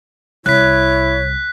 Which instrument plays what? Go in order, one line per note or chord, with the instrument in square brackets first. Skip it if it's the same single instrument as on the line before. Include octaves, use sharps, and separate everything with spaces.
[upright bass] C2 [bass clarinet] E4 [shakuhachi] C#5 [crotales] F#6 B6